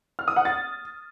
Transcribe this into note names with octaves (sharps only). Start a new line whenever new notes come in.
F6
D#6
F#5
A6